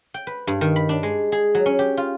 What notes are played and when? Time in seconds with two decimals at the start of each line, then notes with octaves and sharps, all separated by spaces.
0.14 G5
0.27 B4
0.47 G2
0.61 D#3
0.76 B5
0.89 D4
1.03 G#3
1.32 G#4
1.55 F#3
1.66 C#4
1.79 G4
1.97 F4